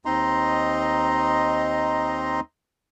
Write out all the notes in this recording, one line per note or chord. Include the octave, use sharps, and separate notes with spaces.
D#2 C4 D#4 D#5 A#5 C6